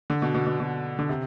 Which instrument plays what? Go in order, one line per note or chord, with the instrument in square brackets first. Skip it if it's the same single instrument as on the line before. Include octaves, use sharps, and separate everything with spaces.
[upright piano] D3
B2
B2
B2
B2
D3
C3